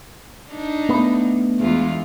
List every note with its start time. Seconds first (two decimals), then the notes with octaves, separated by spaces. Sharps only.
0.49 D4 D#4
0.89 A3 B3
1.60 E2 G#3 F4